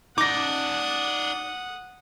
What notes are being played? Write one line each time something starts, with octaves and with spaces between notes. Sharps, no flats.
D#4 D5 F#5 D6 D#6 A#6